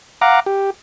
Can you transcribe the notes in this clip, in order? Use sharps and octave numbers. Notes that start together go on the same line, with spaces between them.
F5 F#5 A#5 D6
G4